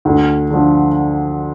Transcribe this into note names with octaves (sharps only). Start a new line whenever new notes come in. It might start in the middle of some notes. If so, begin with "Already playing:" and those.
D2
D3 F3